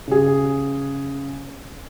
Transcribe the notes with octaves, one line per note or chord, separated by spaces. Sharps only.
C#3 G#4